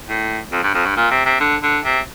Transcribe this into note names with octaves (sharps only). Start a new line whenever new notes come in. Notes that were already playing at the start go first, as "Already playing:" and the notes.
A2
F2
G2
F2
G2
A#2
C3
C3
D3
D3
C3